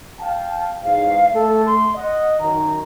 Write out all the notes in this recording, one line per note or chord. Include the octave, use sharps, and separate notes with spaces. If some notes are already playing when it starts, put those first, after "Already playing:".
F5 G5 A5
E2 G#2 F5
A3 A4
C6
D#5 F#5
F#2 D#3 A#5